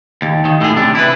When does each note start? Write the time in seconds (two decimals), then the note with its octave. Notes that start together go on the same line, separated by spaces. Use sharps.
0.22 D#2
0.45 D#3
0.61 A2 G#4
0.76 C3 D4
0.95 E4 B4